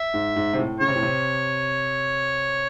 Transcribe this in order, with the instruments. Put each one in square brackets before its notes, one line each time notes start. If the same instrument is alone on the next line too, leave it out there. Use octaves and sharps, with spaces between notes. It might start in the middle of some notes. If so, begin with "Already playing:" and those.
Already playing: [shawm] E5
[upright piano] G#2
G#2
C3
A2
[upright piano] C#3 [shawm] C#5
[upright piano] C3
A2
C3